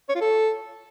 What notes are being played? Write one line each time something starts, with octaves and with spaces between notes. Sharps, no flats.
C#5
F4
A4